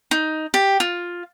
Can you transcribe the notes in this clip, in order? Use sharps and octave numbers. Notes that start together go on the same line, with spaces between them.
D#4
G4
F4